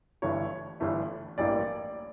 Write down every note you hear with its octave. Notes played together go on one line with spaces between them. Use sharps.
G1 G2 E3 A3 C#5
G1 G2 E3 A3
A1 G2 E3 A#3 D5